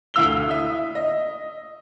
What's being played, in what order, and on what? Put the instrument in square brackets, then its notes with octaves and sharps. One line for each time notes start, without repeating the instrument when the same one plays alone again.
[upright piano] D2 E4 F5 E6 F7 G7
E5 D#6
D#5